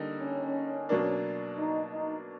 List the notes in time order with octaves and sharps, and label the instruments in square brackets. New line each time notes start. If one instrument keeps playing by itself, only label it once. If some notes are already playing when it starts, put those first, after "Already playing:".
Already playing: [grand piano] D3 G3 A#3 D#4
[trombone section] C#4
[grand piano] B2 F#3 A#3 D4
[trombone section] D#4
D#4